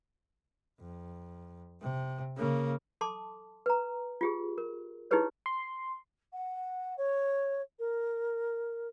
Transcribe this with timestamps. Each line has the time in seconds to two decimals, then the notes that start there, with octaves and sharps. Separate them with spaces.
0.80 F2
1.81 C3
2.37 C#3 A#3
3.01 A4 A5 C6 D6
3.66 B4 A#5
4.21 F4 G4 G#4
4.58 A#4
5.11 D#4 E4 G4 G#4 B4 C#5
5.46 C6
6.33 F#5
6.97 C#5
7.79 A#4